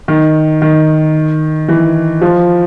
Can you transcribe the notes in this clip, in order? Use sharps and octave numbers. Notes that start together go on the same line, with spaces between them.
D#3
D#3
E3
F3